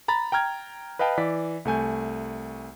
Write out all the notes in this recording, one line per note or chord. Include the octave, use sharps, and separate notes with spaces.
A#5 B5 A6
G5 A#5 F6 G#6
B4 D#5 F5 G5 A5
E3 D5 B6
C2 A3 G#5 G6